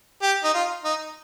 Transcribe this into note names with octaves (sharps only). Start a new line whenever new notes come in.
G4
D#4
F4
D#4